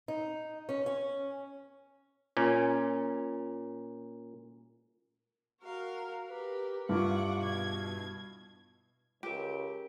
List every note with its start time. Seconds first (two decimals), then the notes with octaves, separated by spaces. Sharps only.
0.08 D#4
0.69 C#4
0.86 C#4
2.37 A#2 C#4
5.61 F#4 A#4 F5
6.30 G4 A#4 B4
6.89 G2 E4 F4 F#5 C#6 D6
7.41 B2 G#6
9.23 C#2 G4 A#4 D7